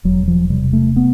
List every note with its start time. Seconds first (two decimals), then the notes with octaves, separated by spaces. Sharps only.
0.04 E1 F#3
0.28 F3
0.50 C3 G3
0.73 A3
0.96 B3